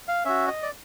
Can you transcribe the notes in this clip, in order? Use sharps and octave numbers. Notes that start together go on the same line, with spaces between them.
F5
C#4 F#4 E5
D#5
D5